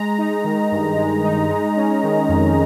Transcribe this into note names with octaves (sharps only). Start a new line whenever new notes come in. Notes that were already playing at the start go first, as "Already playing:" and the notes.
Already playing: G#3 A#5
D#4
D#3
G2
G#3
D#4
G#3
C#4
D#3
F2